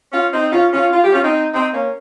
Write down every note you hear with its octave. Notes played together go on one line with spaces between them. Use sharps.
C#4 F4
C4 D#4
C#4 F4
C#4 F4
F4
G4
C#4 F4
C4 D#4
C4 D#4
A#3 C#4